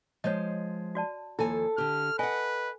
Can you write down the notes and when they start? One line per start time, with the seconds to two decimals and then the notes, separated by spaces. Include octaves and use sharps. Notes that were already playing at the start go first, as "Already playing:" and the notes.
0.24 F3 G#3 C#5 D#5 F5
0.95 F#4 D5 A5
1.39 D#2 F3 E4 A4 G#5 B5
1.78 D3 G4 F6
2.19 B4 D#5 F#5 G#5